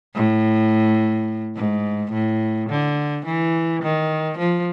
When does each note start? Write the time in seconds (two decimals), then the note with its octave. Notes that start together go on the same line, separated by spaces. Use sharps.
0.15 A2
1.56 G#2
2.12 A2
2.70 D3
3.26 E3
3.83 D#3
4.38 F3